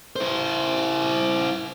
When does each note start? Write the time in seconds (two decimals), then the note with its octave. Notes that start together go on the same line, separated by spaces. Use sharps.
0.16 E4 C5